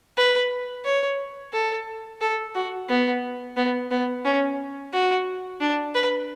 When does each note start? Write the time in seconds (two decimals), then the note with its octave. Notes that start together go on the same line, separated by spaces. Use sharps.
0.17 B4
0.85 C#5
1.53 A4
2.21 A4
2.55 F#4
2.89 B3
3.57 B3
3.91 B3
4.25 C#4
4.93 F#4
5.61 D4
5.94 B4